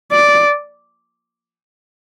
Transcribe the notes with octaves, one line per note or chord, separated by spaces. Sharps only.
D5